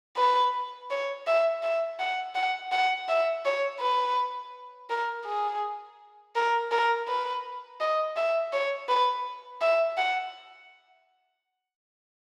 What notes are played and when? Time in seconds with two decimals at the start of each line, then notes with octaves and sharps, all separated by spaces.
0.17 B4
0.90 C#5
1.27 E5
1.63 E5
2.00 F#5
2.35 F#5
2.72 F#5
3.08 E5
3.45 C#5
3.80 B4
4.90 A#4
5.25 G#4
6.36 A#4
6.71 A#4
7.08 B4
7.80 D#5
8.17 E5
8.53 C#5
8.89 B4
9.61 E5
9.97 F#5